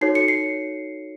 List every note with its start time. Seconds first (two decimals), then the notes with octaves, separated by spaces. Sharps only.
0.01 D#4 F#4 A4 C#5 C7
0.15 C#7
0.28 C7